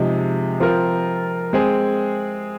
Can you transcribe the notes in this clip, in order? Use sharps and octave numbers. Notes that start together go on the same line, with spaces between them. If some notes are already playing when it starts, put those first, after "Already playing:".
Already playing: C3 F3 G#3 D#4 G#4
F3 C4 F4 A#4
G#3 C4 G#4